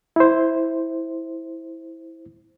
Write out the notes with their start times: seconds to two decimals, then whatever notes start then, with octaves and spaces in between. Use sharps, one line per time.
0.16 E4 C5